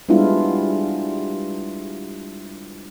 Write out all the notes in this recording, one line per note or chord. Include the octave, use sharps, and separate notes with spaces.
G3 G#3 B3 D4 E4 F4